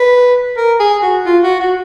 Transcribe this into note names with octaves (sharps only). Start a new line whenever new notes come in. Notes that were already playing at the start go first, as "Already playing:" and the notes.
Already playing: B4
A#4
G#4
F#4
F4
F#4
F#4